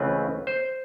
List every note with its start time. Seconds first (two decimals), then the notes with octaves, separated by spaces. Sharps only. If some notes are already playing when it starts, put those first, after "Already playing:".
Already playing: C#2 C#3 E3 A3 C4 B4
0.47 C5